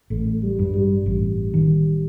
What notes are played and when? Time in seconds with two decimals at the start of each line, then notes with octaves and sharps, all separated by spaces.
0.10 A1 A3
0.43 G3
0.59 G2
0.74 G3
1.06 A1 G3
1.54 D#3